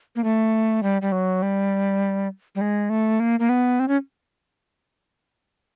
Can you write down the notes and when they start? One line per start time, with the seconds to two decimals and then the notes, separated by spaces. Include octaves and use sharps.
0.16 A#3
0.24 A3
0.83 G3
1.02 G3
1.12 F#3
1.42 G3
2.55 G3
2.61 G#3
2.90 A3
3.20 A#3
3.40 A#3
3.49 B3
3.80 C4
3.88 C#4